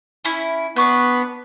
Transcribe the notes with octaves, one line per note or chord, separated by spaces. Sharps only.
C#4 E4
B3 D4 C#6 F#6